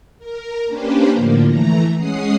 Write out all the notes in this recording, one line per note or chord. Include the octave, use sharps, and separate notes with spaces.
A#4
A#3 C#4 D4 G4 B4 C5
A2 D3 F3 A#3
E3 A3 A#5
G#3 C#4 F#5 D#6 C7